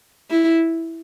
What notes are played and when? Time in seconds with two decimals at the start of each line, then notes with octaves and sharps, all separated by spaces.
0.31 E4